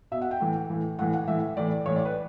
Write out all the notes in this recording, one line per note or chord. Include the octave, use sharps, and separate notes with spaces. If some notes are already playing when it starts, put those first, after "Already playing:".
B2 E5
F#5
G5
A2 E3
A2 E3
A2 E3 F#5
F#5
A2 E3 E5
A2 E3 D5
A2 E3 C#5
D5
B4